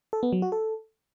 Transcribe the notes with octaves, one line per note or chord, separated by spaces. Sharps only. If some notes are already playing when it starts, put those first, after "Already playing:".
A4
B3
F#3
F#4
A4